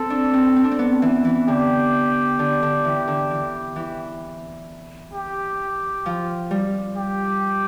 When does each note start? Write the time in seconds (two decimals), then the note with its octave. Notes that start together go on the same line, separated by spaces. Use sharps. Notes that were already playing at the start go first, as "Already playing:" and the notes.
Already playing: C4 A4
0.10 D4
0.34 C4
0.56 C4
0.64 D4
0.71 C4
0.79 B3
1.02 E3
1.25 E3
1.48 D3 G4
2.39 D3
2.63 D3
2.85 E3
3.08 D3
3.31 E3
3.76 E3
5.13 G4
6.06 F3
6.51 G3
6.97 G4